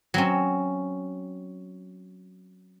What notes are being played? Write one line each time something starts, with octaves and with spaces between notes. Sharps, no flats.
F#3 C4 C#4